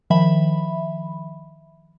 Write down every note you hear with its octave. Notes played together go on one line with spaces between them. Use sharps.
D#3 F3 E5 B5